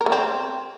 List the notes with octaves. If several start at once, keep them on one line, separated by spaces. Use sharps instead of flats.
A#4
A3
C4